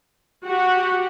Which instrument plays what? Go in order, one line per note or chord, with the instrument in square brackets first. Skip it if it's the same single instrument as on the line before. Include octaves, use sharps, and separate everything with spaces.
[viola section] F#4 G4 F#5